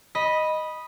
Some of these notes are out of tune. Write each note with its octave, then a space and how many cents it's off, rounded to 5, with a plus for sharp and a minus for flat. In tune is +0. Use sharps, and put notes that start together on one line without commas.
D#5 +0 B5 -10